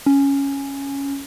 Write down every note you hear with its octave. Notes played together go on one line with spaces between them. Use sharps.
C#4